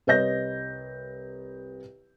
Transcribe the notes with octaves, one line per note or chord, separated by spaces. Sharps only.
C2 B4 C#5 D#5 G6 A#6